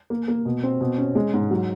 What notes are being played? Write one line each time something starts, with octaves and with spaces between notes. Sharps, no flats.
A#3
A#3
B2
C4
B2
C#4
G#3
G#2
F#3